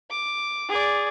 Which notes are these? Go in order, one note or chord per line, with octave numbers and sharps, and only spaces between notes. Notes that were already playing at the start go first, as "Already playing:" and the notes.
D6
G#4 D5